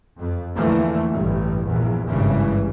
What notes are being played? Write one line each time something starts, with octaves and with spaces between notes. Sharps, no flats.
F2
E2 D3 E3 F3 A3 A#3
A1 G2
A#1 E2
G#1 G2 C#3 E3